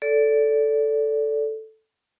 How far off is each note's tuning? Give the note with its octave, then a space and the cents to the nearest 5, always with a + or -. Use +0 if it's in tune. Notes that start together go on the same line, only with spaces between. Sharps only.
A4 +0 D5 -25